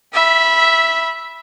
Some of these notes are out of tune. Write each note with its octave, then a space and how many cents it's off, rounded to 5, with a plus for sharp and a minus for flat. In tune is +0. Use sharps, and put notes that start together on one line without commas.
E5 +0 B5 -15